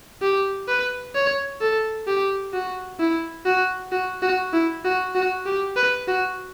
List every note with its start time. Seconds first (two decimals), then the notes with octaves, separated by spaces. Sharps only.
0.22 G4
0.68 B4
1.15 C#5
1.61 A4
2.07 G4
2.54 F#4
3.00 E4
3.46 F#4
3.92 F#4
4.22 F#4
4.53 E4
4.85 F#4
5.15 F#4
5.46 G4
5.76 B4
6.08 F#4